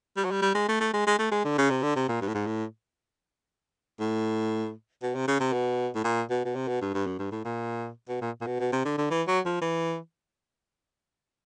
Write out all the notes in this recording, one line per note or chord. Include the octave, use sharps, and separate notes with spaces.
G3
F#3
G3
G3
G#3
A3
A3
G#3
G#3
A3
G#3
D3
C#3
C3
D3
C3
A#2
G2
A2
G#2
A2
A2
B2
C3
C#3
C3
B2
A2
A#2
B2
B2
C3
B2
G2
G2
F#2
G2
A2
A#2
B2
A#2
A#2
B2
B2
C3
D3
D3
E3
F#3
F3
E3